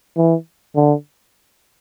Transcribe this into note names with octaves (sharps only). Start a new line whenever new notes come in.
E3
D3